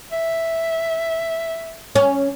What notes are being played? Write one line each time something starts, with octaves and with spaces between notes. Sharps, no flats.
E5
C#4